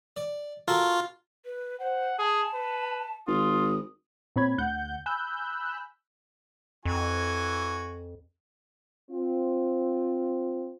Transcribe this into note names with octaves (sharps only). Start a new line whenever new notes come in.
D5
F4 F#4 A4 A#4
B4
C5 F#5
G#4 A5
B4
G#1 F4 D#6
A#2 C4 C#5 B5 G#6
D2 F#5 G6
G#5 B5 E6 F#6 G6
F2 E3 F#4 G#5
C4 F4